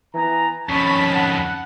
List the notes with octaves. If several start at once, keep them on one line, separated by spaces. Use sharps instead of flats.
E3 B3 G#5 A#5
F2 D#3 C#4 A5 B5 C#6
F#5